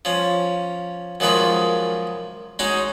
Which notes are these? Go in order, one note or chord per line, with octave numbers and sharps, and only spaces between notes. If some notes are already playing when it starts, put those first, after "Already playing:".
F3 C#4
F#2 D#3 F3 G#3 B4 C#6
G#3 C#4 D#4 F#4